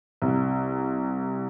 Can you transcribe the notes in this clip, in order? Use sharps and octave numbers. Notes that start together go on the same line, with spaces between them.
C2